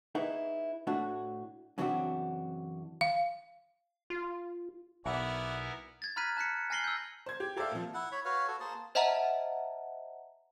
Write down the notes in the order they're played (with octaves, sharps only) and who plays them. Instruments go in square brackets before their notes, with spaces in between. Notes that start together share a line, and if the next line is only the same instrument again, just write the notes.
[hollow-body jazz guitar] D#4 E4 G#4 B4
A2 A3 D4 F#4
F#2 C#3 E3 C4 D4 F#4
[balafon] F5
[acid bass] F4
[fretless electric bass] B1 [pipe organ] B3 E4 A#4 [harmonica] D5 F#5 G#5 [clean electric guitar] E5
[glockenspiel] G#6 A6
A#5 B5 F6 F#6 B6 D#7
A5 F#6 B6 C#7
G#5 F6 A#6 C7 F#7 G7
E6 G6
[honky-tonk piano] C5 G#6
G4
G4 A4 C5 D5 E5 F5
A#2 F3
[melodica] E4 F#5
C#5 B5
F#4 B4 C#5 F5
F#4 A4
A#3 G#4 C5 A5
[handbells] C5 D#5 E5 F#5 A5 A#5